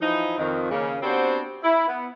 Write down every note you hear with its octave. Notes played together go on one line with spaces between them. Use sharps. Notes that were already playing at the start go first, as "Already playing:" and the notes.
E3 F3 D#4
F2 D#3
C#3 A#3
B3 C4 D4 F#4 G4 C5
E4
B3